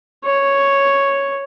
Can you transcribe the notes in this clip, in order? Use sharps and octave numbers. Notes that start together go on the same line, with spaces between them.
C#5